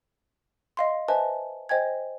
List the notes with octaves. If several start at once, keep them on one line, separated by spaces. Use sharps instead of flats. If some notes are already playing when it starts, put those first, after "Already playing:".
D#5 F5 C6
B4 C5 D#5 E5 G#5 A5
C5 D#5 G5 G#5 G#6